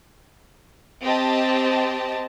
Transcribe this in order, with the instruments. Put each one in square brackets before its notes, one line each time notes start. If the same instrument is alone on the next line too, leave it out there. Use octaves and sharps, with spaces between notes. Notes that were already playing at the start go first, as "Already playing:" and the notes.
[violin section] C4 G4 D#5 A5